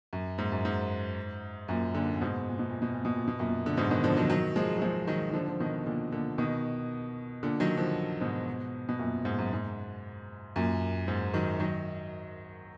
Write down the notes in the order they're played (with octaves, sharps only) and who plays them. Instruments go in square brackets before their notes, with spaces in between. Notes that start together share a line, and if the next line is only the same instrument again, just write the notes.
[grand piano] F#2
G#2
F#2
G#2
F#2 A#2
A#2 D3
A#2
G#2 B2
A#2
B2
A#2
B2
A#2
B2
A#2
B2
F#2 A#2
D3
G#2 B2
B2 D#3
D3 F3
D#3 F#3
D#3 F#3
F3 G#3
F#3
F3 G#3
D#3 F#3
D#3
D3 F3
F3
B2 D#3
A#2 D3
A#2 D3
B2 D#3
A#2 D3
D#3 F#3
D3 F3
G#2 B2
B2
F#2 A#2
G#2
F#2
G#2
F#2 A#2
G#2
D#3 F#3
D#3 F#3